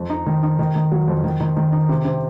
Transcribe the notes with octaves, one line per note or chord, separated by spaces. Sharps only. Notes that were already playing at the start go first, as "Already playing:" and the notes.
Already playing: F2
D#4
D#3
D#4
D#3
D#3
F#3
F2
D#3
D#3
D#3
D#4
C3
C3